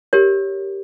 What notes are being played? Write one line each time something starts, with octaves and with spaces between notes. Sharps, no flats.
G4 A#4 C#5